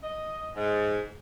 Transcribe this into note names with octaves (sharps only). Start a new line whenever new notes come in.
D#5
G#2